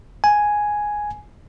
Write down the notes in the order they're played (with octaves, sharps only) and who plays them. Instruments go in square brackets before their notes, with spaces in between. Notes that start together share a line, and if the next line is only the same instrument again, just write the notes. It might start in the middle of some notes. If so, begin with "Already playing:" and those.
[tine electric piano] G#5